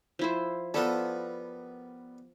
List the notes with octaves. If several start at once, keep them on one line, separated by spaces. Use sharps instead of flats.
F3 E4 C5
F3 G3 B3 A4 A#4